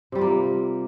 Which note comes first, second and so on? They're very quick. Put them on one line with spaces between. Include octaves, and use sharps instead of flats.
C3 G3 F4 A#3